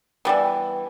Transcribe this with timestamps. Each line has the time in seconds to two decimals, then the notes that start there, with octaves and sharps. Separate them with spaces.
0.25 E3 G3 B3